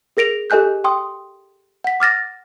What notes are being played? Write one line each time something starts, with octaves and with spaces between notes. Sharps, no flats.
G#4 A#4 A#6 D7 F7
G4 A4 D#5 G#5 F#6 G6
G5 C6 D#6
F#5 B6
D6 F6 A6 A#6